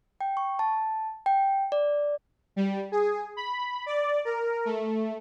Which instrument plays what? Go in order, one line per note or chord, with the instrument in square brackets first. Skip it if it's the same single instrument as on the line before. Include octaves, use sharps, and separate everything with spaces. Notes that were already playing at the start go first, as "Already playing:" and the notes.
[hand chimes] G5
C#6
A5
G5
D5
[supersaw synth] G3
G#4
B5
D5
A#4
A3